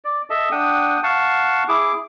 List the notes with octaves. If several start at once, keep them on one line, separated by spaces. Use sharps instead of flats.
D5
A4 D#5 E5 A5
D4 F#5 G5 D#6
F5 F#5 A5 C#6
E4 G#4 D6